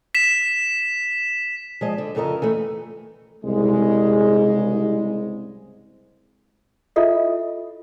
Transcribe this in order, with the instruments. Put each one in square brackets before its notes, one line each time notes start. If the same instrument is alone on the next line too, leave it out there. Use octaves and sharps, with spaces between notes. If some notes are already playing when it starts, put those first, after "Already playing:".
[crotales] B6 E7
[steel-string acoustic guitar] F3 G#3 D#5
D3
F2 C#3 A4 A#4 D#5
E3 A3
[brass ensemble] C2 G#2 C#3 G#3
[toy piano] E4 F4 A4 D#5 E5